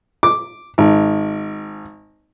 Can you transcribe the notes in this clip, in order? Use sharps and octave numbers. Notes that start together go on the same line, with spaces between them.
D6
G#1